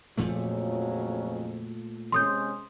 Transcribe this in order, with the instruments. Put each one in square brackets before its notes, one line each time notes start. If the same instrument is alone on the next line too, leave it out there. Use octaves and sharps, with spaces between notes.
[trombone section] F2 C#3 F#3 [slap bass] A#2 F3 A3
[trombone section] C3 G#3 C#4 [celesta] C6 D#6 G6